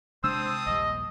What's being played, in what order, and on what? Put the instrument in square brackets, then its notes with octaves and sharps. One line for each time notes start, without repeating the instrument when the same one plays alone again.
[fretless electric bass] C3 G#3 D4 [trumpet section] C4 A5 D#6 [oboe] C5 [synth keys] E6
[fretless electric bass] A#1 D#2 G3 [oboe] D#5